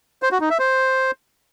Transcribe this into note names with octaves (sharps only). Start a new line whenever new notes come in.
C5
F#4
D#4
E5
C5